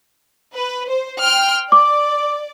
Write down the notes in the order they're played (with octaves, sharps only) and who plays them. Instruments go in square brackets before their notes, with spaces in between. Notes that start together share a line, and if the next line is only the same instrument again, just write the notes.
[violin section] B4
C5
G5 C6 F6
[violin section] D5 [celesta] D6